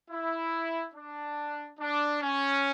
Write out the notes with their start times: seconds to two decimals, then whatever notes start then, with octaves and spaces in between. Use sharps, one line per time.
0.10 E4
0.94 D4
1.80 D4
2.23 C#4